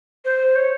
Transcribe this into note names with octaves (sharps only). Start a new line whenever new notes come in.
C5
C#5